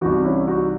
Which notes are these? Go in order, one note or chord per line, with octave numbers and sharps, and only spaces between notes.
C2 C3 E3 D#4 F#4
C#4 E4
D#4 F#4